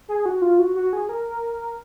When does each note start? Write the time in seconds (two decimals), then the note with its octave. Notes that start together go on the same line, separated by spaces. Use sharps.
0.09 G#4
0.26 F#4
0.42 F4
0.59 F#4
0.76 F#4
0.93 G#4
1.09 A#4